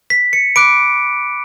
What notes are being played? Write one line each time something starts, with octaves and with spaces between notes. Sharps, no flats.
B6
C#7
B5 D6 F#6 D7